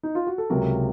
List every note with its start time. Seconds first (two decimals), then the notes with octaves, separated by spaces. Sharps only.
0.03 D#4
0.15 F4
0.27 F#4
0.38 A4
0.50 C#2 C3 F#3 A#4